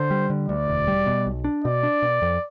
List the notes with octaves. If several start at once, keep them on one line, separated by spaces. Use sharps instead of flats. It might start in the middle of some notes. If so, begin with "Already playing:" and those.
Already playing: D3 C5
G3
D3
D2 D5
E1
G3
B2
B1
D4
B2 D5
D4
B2
F2